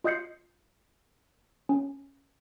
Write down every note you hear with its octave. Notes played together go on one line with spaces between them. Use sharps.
F4 D#5 D#6 G6 C7 C#7
C#4